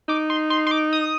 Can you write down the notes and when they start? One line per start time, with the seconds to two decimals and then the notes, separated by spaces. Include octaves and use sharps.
0.09 D#4 D6
0.30 C6
0.50 C6
0.67 C6
0.71 D6
0.93 D#6